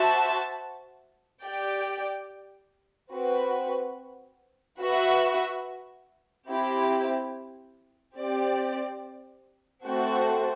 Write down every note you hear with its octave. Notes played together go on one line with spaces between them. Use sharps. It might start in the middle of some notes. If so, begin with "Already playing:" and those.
Already playing: F#4 C5 E5 A5
G4 D5 G5
C4 F#4 B4
F#4 B4 E5
C4 E4 G4
C4 G4 D5
A3 C4 F#4 A4 C5